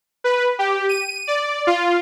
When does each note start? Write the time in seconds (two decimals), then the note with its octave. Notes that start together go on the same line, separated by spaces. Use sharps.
0.24 B4
0.59 G4
0.89 D#7
1.27 D5
1.67 F4